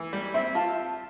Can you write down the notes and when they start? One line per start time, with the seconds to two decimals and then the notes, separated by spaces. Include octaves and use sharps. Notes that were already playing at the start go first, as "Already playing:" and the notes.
Already playing: E3
0.13 G3
0.34 C4 E5
0.55 F4 A5